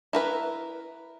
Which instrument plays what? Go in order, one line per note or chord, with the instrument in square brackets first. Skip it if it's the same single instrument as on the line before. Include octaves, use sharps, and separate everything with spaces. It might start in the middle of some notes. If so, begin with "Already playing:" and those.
[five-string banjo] E4 A#4 B4